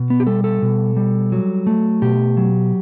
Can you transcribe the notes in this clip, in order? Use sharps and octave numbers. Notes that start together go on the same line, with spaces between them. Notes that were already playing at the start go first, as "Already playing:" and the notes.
Already playing: B2
B3
G4
G3 A4
A4
B2
G3
F#3
A3
B2 G4
F#3